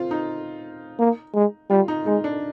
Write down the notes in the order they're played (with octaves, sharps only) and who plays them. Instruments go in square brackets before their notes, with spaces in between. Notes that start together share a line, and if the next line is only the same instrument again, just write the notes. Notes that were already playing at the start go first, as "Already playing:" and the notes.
Already playing: [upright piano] C4 F4
D#4
[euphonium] A#3
G#3
[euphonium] G3 [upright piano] F4
[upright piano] D#4
[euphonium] G#3 [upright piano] D#4
[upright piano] D4